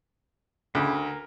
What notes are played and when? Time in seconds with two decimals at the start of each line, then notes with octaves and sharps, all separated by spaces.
0.75 D2 C#3 E4 G4
0.94 A#4